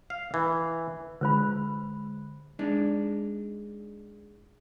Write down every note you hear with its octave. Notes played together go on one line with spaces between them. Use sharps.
F5
E3
D3 G#3 B4 C5 B5
G#3 D4 D#4